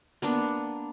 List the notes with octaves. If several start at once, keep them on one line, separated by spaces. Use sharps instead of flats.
A#3 B3 D4